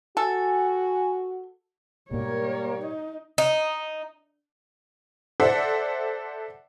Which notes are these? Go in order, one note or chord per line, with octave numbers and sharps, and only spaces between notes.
F#4 A4 G#5
G#2 B2 G3 A#3 A#4 C#5
D#4 D#5
D#4
A4 C5 D5 E5 F#5